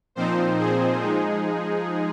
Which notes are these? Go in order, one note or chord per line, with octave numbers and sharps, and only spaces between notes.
A#2 F3 C4 D#4 C5
G#4
F3 G#3 D#4